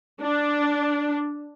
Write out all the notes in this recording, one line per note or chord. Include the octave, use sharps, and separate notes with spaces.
D4